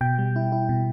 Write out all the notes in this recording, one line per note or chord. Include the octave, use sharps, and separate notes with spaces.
B2 G5
G3
E4
E4
B2